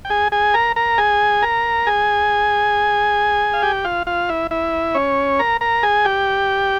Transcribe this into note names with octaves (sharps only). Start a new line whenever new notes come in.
G5
G#4 G#5
G#4 G#5
A#4 A#5
A#4 A#5
G#4 G#5
A#4 A#5
G#4 G#5
F5
G4 G5
F4 F5
F4 F5
E4 E5
E4 E5
C#4 C#5
A#4 A#5
A#4 A#5
G#4 G#5
G4 G5